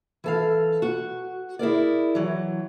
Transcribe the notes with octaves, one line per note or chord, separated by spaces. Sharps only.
E3 A4 F5
F#4
E4 G#4 A#4 D5
E3 F#3